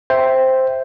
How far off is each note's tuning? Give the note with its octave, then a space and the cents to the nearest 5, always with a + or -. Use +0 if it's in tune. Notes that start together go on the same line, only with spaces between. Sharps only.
C5 +0 E5 +0 G5 +0